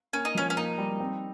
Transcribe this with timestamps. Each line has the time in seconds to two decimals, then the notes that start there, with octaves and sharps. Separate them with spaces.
0.13 A#3 C#4
0.25 D#4
0.35 F3 C#4
0.50 C#4
0.56 A#3 D#4
0.78 G3
1.00 C4